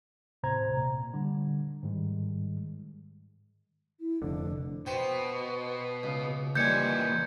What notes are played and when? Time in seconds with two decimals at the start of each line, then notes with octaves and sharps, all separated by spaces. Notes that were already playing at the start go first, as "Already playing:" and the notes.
0.43 D#2 A2 C3 C5 A#5 G#6
0.77 A#2
1.14 D3 G3
1.83 G#2 D#3 G3 G#3
4.00 E4
4.22 F1 D3 D4
4.86 B2 C5 G5 C6
6.03 C#2
6.55 D#2 A#2 E3 G3 C#4 G6 G#6 C#7